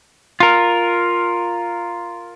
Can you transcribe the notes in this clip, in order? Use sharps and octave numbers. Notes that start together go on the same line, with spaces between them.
F4 A#4